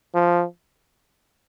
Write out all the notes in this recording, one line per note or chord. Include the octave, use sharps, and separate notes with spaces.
F3